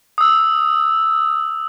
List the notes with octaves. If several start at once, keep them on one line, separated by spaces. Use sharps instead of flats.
D#6 E6